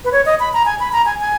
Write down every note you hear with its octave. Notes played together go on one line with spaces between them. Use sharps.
B4
C#5
D#5
B5
A#5
G#5
B5
A#5
G#5
G#5